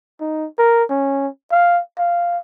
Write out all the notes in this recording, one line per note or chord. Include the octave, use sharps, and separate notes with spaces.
D#4
A#4
C#4
F5
F5